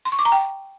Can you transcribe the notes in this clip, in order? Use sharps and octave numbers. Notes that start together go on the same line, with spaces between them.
C6
C#6
D6
A#5
G5